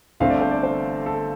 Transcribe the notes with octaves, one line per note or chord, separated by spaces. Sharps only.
G1 G2 D3 A3 C4 F5
D5
C5
D5
C5
A4